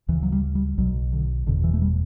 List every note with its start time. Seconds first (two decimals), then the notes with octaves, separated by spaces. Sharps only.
0.08 D2 E3
0.12 C#3
0.23 F#3
0.32 G3
0.55 G3
0.78 B1 B2 F#3
1.13 D3
1.46 F#1 E2 B2 D3
1.64 E3
1.73 A3
1.82 G3